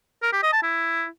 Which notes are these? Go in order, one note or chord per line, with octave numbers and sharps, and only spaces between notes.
A#4
G4
D#5
A5
E4